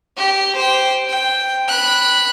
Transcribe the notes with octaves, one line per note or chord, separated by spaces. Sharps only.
G4
C5 G5
G5
B5 F#6